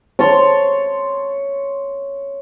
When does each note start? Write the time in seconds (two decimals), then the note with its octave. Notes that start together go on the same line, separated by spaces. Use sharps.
0.19 C#5 A5 C6